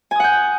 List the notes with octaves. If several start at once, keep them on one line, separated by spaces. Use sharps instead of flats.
F#5 G#5 D#6 G6